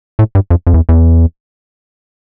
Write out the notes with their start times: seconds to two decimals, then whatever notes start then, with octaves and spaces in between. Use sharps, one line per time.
0.19 A2
0.35 G2
0.50 F2
0.67 F2
0.74 E2
0.89 E2